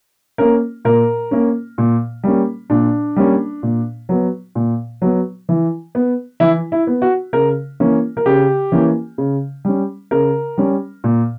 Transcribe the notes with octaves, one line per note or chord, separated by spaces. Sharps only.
A#3 C#4 A#4
A#2 A#4
A#3 C#4
A#2
G3 A#3 C#4
A#2 D4
G3 A#3 C#4
A#2
F#3 B3
A#2
F#3 B3
E3
B3
E3 E4
E4
B3
F#4
C#3 A#4
E3 A#3 C#4
A#4
C#3 G4
E3 A#3 C#4
C#3
G3 C#4
C#3 A#4
G3 C#4
A#2